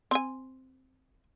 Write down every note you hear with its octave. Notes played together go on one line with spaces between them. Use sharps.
C4 G#5